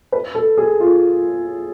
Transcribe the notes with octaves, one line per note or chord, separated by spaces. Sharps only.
B4
A4
G#4
F4